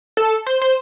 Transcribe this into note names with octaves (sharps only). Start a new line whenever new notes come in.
A4
C5
C5